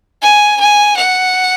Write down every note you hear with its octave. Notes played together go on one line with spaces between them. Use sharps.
G#5
G#5
F#5